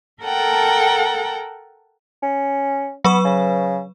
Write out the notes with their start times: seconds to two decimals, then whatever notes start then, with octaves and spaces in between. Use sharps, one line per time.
0.22 A4 A#4 F#5 G5 A5
2.23 C#4
3.05 F#3 B3 B4 C#6
3.25 C#3